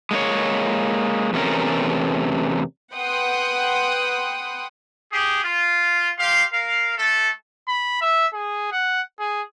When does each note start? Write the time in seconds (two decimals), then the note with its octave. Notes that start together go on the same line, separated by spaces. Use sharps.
0.11 G#3 A#3 D4 C#5
1.33 E2 C3 A3 C#4 A#4
2.95 B4 F#5 G5 C6 D#6 F#6
5.13 G4 G#4
5.43 F4
6.19 G4 F5 C6
6.53 A#4 F5
6.98 A3 A4 A5
7.68 B5
8.02 E5
8.34 G#4
8.72 F#5
9.20 G#4